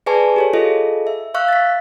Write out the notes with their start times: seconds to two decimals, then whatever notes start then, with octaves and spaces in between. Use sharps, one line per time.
0.06 G#4 B4 D5 G#5 A5 C#6
0.36 G4 A4 C#5
0.53 F4 G#4 A4 D#5
1.07 E5
1.34 E5 F5 C#6 E6 F#6
1.48 A6 B6